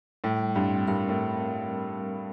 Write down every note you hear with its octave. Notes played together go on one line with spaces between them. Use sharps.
A2 G3
G2 C4
G2 A#4
A2